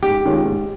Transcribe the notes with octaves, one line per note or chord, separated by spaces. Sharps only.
G#2 G4
D#3 G#3 C#4 F4
G#2